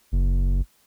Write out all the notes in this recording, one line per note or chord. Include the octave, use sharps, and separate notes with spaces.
F#1